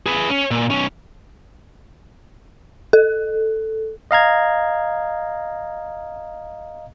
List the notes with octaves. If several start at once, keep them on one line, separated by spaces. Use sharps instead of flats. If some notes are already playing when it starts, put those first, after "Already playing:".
G#4 B4
C#4
A#2
B1 C#4
A4
D#5 F5 A#5 G#6